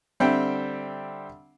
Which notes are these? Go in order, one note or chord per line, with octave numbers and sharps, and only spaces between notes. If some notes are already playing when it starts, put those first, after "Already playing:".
D3 G3 C4 E5 G5